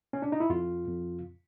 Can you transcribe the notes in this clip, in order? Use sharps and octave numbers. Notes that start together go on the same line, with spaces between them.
C#4
D4
D#4
E4
F2 F4
F2